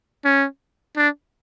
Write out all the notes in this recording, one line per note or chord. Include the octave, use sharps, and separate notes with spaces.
C#4
D4